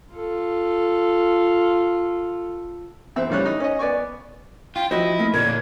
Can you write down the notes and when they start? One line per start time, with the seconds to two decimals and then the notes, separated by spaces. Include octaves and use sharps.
0.16 F4 A4
3.16 E2 C4 E5
3.30 A2 C#3 G3 C#5 F#6
3.45 D#4
3.60 C#4 D#5
3.79 B3 D5 G#5 C#6
4.76 F4 G5
4.91 F3 E4 F#4 C5 D#5
5.19 A3 A#3 C4
5.34 A#2 D3 A#4 C#5 D5 G#6